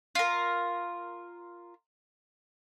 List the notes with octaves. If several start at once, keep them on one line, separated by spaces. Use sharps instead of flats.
F4 A#4